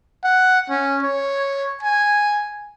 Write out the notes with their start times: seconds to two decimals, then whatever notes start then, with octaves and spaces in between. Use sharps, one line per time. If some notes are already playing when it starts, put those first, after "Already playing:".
0.24 F#5
0.69 C#4
1.03 C#5
1.83 G#5